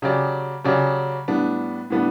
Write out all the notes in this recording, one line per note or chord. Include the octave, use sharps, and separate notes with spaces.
C#3 F#3 C#4 G4 D5
C#3 F#3 C#4 G4 D5
A2 G3 B3 D4
A2 G3 B3 D4